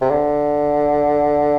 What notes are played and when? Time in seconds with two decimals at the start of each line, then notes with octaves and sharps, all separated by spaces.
0.01 C3
0.10 D3